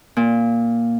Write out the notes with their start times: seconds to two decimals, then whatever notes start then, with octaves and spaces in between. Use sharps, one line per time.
0.16 A#2